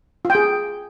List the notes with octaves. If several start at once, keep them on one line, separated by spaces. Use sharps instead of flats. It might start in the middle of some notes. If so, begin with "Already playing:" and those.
F4
G5
G#4